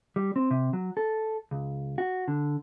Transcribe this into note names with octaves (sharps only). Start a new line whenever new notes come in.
G3
C4
C3
F#3
A4
C#2
F#4
D3